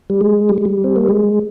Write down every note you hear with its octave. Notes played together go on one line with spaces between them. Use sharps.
G3
G#3
G3
G#3
G3
C4
A#3
G#3